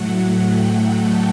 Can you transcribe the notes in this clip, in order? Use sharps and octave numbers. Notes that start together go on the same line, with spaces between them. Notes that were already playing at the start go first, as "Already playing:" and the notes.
Already playing: A2 F#3 A3 F#5
G5
A5